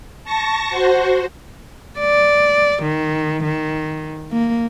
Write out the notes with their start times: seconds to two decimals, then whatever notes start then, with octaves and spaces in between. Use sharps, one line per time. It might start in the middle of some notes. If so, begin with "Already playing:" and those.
0.24 A5 C#6 A#6
0.70 F#4 C5
2.00 D5
2.83 D#3
3.44 D#3
4.32 A#3